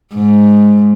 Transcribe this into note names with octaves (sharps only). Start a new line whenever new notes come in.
G#2